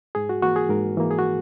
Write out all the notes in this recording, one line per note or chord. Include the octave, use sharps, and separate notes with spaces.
G#2 G#4
F#4
E3 A#3 F#4
G#4
G#2 A#4
E3 A#3
G#4
F#4